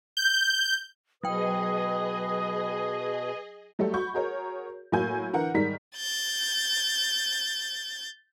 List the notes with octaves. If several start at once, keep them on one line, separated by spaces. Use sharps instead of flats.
G6
B2 F#3 G#4 B4 D#5 G5 D#6
F#3 G3 A3 F#4 G4 A4
F#4 B5 C#6 G6
F#4 G#4 A#4 C#5
A2 F#3 A#3 F#4 G#5 G6
D3 E3 A#4 F#5
G#2 D#3 G3 A#4 B6
G6 A6